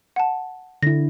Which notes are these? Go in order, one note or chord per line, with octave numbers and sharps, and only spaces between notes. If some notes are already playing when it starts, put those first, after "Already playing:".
F#5 A5
D3 E4 A#6